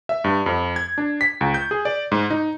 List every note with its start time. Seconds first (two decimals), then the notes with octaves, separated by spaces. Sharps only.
0.09 E5
0.24 G2
0.46 F2
0.76 G#6
0.98 D4
1.21 B6
1.41 C#2
1.54 G6
1.71 G#4
1.85 D5
2.12 G#2
2.30 D#4